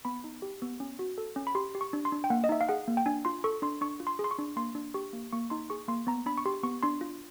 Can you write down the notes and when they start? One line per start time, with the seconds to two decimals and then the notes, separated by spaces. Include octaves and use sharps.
0.05 B3 B5
0.24 D#4
0.42 G4
0.62 B3
0.80 C#4
0.99 F#4
1.18 A4
1.36 C#4
1.47 B5
1.55 G4 C6
1.75 G4
1.81 C#6
1.93 D4
2.05 C6
2.12 D4
2.24 G5
2.30 A#3 F#5
2.44 D#5
2.49 D#4 E5
2.61 F5
2.69 G#4 F#5
2.88 A#3
2.97 G5
3.06 D4 G#5
3.25 F4 C6
3.44 A4 C#6
3.62 D4 C6
3.81 D4 C#6
4.00 F4
4.07 C6
4.19 G#4
4.24 C6
4.31 C#6
4.39 D4
4.56 A#3 C6
4.75 D4
4.94 G4 C#6
5.13 A#3
5.32 A#3 C#6
5.50 D#4 C6
5.70 G#4 C#6
5.88 A#3 C6
6.07 B3 A#5
6.26 D4 B5
6.38 C#6
6.46 G4 C6
6.63 B3 C#6
6.83 D4 C6
7.01 F4